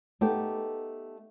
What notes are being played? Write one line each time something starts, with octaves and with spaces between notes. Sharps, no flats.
A3 B3 D#4 G4